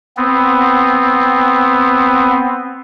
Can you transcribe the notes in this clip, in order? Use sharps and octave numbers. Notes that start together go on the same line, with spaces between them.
B3 C4